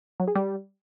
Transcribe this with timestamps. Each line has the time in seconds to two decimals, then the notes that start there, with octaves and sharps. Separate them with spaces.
0.20 F#3
0.28 G#4
0.35 G3